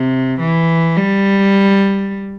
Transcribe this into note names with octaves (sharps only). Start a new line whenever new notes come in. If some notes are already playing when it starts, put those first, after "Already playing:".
Already playing: C3
E3
G3